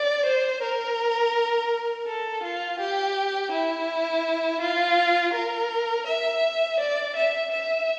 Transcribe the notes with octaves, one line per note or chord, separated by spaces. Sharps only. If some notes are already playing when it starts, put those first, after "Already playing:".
Already playing: D5
C5
A#4
A4
F4
G4
E4
F4
A#4
E5
D5
E5
E5